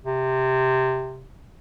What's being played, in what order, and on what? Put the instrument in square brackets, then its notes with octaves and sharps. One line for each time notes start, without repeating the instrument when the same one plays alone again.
[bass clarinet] C3